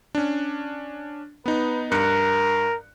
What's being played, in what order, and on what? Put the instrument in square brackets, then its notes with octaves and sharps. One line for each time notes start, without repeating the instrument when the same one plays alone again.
[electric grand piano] C#4 D4
[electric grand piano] B3 D#4 [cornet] B4
[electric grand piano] G2 F#6 C#7 [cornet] A#4